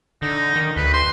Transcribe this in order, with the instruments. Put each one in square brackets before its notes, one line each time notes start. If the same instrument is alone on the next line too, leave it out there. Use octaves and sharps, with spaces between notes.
[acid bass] D3 [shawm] D#4
[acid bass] D#3
[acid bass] D2 [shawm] B4
[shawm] C6